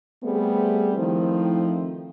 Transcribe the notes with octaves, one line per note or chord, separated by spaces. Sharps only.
G3 A3 B3 C4 G#4
D#3 F3 A3 C4 E4